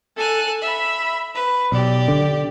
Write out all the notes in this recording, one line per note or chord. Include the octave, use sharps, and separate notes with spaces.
A4 G#5 F#6
E5 B5
B4
B1 G4 D5
D3